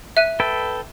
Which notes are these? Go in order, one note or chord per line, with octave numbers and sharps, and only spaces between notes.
E5 F#6 D#7
A4 B4 G5